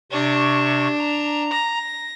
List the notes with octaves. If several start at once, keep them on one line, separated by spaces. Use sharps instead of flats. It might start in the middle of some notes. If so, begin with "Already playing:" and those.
C3 D4 C#6
A#5
A#6